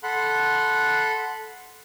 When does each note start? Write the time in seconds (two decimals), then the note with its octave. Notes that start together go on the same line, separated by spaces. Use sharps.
0.03 A4 F#5 B5 C6 F#6